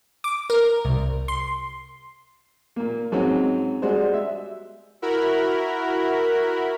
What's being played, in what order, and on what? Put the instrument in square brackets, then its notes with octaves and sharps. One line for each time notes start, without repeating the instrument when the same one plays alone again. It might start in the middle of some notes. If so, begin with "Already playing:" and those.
[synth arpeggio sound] D6
A#4
C2
C6
[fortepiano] A#2 A#3
G#2 F#3 G#3 C4 C#4
G3 G#3 D4 F#4 C5
E5
[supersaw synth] E4 F#4 A#4 B5